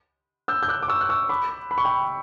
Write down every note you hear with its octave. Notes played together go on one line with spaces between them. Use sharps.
E6 G6
G6
D6 F#6
D6
C#6 E6
F#6
C#6 E6
B5 D6
B5
C#6
G5 B5